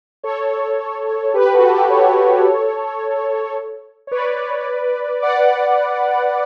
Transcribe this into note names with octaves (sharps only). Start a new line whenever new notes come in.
A4 C#5
G4 B4
F#4 A4
G4 B4
A4 C#5
C#5
B4 D5
D5 F#5